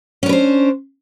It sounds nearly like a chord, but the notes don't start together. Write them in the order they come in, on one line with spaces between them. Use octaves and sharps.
C#4 D4 B4 C5